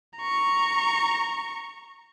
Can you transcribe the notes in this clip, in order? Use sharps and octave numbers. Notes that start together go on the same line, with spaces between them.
A#5 C#6